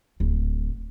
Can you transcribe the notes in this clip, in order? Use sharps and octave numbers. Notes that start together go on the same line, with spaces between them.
D1